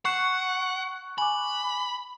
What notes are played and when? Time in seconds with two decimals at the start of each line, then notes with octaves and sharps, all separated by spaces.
0.05 F#5 C#6 F#6 C7 E7
1.18 G#5 B5 D6